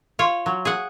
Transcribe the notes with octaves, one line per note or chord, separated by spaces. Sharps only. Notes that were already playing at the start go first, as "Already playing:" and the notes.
F4 C#5
F#3
G#4 F#5